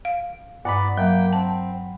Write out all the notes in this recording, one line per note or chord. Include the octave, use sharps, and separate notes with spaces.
F5
G2 B3 D5 F#5 A#5 B5
F#3 A#3 G5
C4 A5